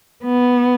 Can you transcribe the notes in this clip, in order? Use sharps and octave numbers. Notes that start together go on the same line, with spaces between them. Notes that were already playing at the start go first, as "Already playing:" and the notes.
B3